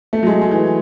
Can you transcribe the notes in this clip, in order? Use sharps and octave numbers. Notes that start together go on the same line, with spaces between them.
A3
F#3
G#3
G#3
E3